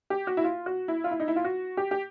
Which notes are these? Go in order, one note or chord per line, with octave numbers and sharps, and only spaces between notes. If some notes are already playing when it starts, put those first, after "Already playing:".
G4
F#4
E4
F4
F#4
E4
F4
E4
D#4
E4
F4
F#4
G4
G4